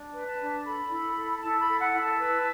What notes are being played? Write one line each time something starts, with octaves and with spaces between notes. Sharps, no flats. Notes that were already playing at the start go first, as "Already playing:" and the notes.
Already playing: D4
B4
A5
D4
A4 B5
E4
A4
E4 A5
B5
A4
F#5
E4
A5
B4